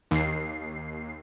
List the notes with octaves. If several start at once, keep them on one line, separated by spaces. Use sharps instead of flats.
D#2 C7